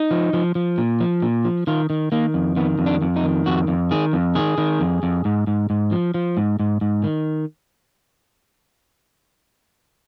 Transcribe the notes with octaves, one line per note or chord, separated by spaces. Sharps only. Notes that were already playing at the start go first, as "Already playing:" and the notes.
Already playing: D#4
F3
F3
F3
A#2
F3
A#2
F3
D#3 F4
D#3
D#3 A#3
F2
D#3 B3
F2
D4
F2
D#4
D#3
F2 F#4
F2
D#3 G#4
F2
D#3 G#4
D#3
F2
F2
G#2
G#2
G#2
F3
F3
G#2
G#2
G#2
D#3